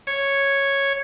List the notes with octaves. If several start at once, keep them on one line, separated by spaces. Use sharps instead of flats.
C#5